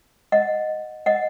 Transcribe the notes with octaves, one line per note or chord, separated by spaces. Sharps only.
D#5 F#5
D#5 F#5